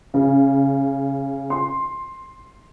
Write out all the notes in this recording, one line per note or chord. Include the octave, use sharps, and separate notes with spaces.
C#3
C6